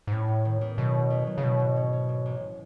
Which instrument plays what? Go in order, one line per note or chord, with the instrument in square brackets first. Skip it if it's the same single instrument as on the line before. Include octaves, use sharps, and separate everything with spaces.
[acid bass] G#2
[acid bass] A2 [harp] C#4
[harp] C#4
D#3
E2
[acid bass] B2 [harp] F#3
[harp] D#3
E2
F#3
[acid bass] C#3
[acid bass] B2 [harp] F#3
[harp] G#2
C#4
C#4
G#2
A1